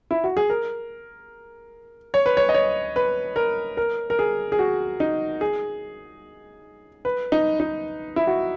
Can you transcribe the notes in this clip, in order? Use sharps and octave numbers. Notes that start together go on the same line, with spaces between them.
E4
F#4
G#4
A#4
C#5
B4
C#5
D#5
C#5
B4
A#4
A#4
A#4
G#4
G#4
F#4
D#4
G#4
B4
D#4
D#4
E4
F#4